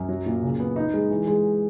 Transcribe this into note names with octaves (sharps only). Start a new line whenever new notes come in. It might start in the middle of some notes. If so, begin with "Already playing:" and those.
Already playing: F#2
F#3
A#2
C#3
B3
D#4
G#3
E3
G#3